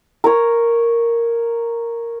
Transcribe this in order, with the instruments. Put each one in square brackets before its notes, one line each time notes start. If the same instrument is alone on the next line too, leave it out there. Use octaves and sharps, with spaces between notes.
[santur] A#4 C#5